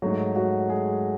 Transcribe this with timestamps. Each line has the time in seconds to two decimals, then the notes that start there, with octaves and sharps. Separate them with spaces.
0.02 G#2 F#3 A3 F#4
0.35 F#3 F#4
0.69 G#3 G#4